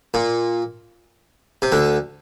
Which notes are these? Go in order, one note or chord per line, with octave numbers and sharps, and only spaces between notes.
A#2
C3
D2 D3